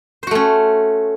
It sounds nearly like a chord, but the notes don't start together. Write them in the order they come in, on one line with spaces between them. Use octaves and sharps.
C5 F#4 A3 C#4